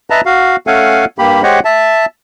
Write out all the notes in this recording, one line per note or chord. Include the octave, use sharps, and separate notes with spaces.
B4 D#5 E5 A5 A#5
F#4 F5
A3 C#4 A4 F5 F#5 G#5
G2 A#3 G4 B5
G#3 G4 C5 C#5 D#5 F#5
E5 A5